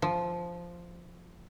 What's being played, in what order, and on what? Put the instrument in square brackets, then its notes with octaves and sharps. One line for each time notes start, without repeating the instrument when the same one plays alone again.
[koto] F3